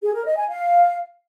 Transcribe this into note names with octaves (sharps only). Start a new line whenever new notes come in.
G#4
A#4
D#5
G#5
F5